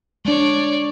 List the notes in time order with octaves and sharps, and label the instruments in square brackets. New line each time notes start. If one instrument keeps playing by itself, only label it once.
[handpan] G#3 D4 [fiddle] C#5 D5